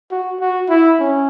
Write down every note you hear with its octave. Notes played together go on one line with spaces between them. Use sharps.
F#4
F#4
E4
C#4